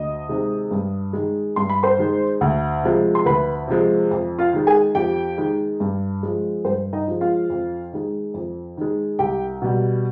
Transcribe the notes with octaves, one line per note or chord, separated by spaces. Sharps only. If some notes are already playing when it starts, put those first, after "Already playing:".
Already playing: D2 D#5 D#6
C3 D#3 G#3
G2
D#3 G#3
G2 C6
B5
C5 C6
D#3 G#3
D2
C3 F3 G#3
C6
D2 B4 B5
C3 F3 G#3
F2
F4 F5
D#3 G#3
G#4 G#5
F2 G4 G5
D#3 G#3
G2
F3 G#3
G2 C5
D#4 D#5
F3 G#3
F4 F5
F2
D#3 G#3
F2
D#3 G#3
C2 G4 G5
B2 G3